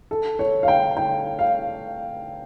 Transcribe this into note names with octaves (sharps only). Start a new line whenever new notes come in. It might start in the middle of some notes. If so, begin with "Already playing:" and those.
A4
C#5
F5
G5
G5
F5